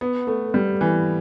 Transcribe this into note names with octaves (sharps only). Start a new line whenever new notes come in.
B3
A3
G3
E3